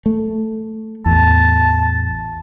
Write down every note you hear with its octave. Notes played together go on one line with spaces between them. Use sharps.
A3
A1 E2 A5